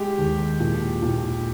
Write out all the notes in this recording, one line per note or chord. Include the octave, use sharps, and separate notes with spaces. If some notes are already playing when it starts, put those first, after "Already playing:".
Already playing: G#3 G4
D#2
A#2
A#2